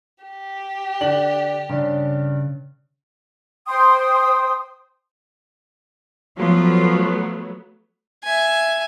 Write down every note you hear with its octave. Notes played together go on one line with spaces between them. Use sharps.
G4
D3 D4 F#7
G2 C#3 D4
C5 G5 C6 D#6
F3 F#3 A3 B3 F4
E5 G#5